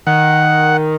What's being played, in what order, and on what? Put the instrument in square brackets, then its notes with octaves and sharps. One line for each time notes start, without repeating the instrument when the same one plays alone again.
[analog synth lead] D#3 [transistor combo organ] F#5